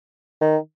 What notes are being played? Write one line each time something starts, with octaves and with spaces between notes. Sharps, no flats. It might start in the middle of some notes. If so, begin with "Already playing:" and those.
D#3